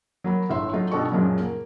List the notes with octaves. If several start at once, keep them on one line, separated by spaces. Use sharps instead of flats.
F#3 A#3 B5
G1 A2 E5 C6
F#3 A3 D#4 F4
G2 B2 G3 A4 D#5 C#6
F#2 A#2 C#3 F3 F#3 G#3
A#3